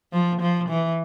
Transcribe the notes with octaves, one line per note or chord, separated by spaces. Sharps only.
F3
F3
E3